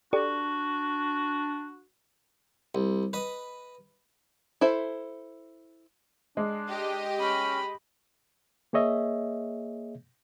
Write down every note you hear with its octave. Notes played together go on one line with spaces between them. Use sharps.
D4 F#4 G4 A4 D5
C2
B4 D#5
E4 A4 C5 E5
G#3 D4
G4 D#5
C#4 B5
A#3 G#4 C#5 D#5 E5